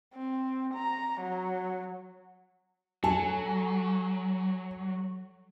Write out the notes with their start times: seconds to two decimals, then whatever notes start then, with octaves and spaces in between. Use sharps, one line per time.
0.14 C4
0.74 A#5
1.21 F#3
3.04 F#3 A4 G#5